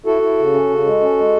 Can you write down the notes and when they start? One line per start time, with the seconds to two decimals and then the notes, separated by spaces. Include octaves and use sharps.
0.06 E4 F#4 A4
0.22 E4
0.38 C#3
0.54 C#4
0.70 C#3
0.85 G#3
1.01 C#4
1.17 G#3